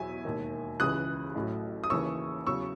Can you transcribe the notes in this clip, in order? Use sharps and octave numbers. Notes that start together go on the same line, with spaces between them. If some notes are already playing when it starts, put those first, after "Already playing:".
Already playing: E2 B2 F#3 E5 G#5
E1 D#2 D#3
C#2 C#3 E3 D#6 F#6
A1 A2 F#3
D#6
D#2 C#3 E3 C#6 E6
E2 C#3 F#3 C#6 E6